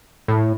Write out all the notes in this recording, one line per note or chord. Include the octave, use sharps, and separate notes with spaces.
A2